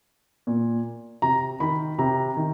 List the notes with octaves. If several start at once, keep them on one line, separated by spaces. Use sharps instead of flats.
A#2
C3 A#5
D#3 B5
C3 A#5
D#3